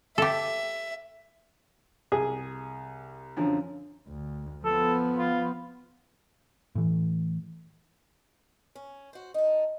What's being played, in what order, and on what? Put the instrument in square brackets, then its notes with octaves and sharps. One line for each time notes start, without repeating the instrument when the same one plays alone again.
[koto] G4 A4 [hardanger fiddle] E5
[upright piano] C2 [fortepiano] G#4
[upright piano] F#2 D3 F3
[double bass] D2
[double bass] F3 B3 [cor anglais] A4
[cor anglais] F4
[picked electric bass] A2 E3
[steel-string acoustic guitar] C#4
F#4 C5
D#4 A4